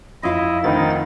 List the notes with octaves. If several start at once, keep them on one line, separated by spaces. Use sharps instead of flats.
F2 E4 F4 D#5 E5
D2 D#3 C4 D#4 B5 A6